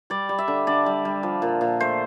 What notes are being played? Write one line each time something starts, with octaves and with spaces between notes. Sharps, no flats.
G3 D5
G3
E5
D3
D3 D5
G3
G3
F3
A#2
A#2
A3 C5